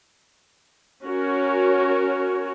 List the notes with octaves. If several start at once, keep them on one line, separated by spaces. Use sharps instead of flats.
C#4 F#4 A#4 C#5